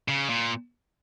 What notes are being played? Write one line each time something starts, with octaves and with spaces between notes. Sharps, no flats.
C#3
A#2